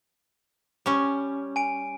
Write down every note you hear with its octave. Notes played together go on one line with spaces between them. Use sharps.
G3 C#4
G#5 D7